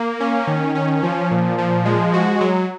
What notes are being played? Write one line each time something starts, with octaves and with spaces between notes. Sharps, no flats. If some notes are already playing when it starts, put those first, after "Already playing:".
Already playing: A#3
C#4
D#3
C#4
F3
A#2
F3
G#3
F#4
F#3